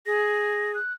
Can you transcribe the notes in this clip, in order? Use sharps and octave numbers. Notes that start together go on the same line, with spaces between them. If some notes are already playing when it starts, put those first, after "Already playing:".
G#4 A#6
F#6